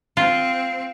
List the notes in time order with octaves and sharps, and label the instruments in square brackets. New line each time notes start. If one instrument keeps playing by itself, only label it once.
[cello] C4 [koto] F4